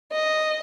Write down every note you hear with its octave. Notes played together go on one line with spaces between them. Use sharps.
D#5